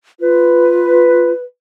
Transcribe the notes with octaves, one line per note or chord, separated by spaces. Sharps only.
F4 B4